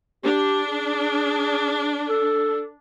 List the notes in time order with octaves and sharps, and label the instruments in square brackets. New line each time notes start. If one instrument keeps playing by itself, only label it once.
[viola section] D4 [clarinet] G4
[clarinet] G#4
A4